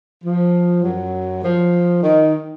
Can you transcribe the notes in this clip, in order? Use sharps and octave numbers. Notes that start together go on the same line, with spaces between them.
F3
F#2 F#3
F3
D#3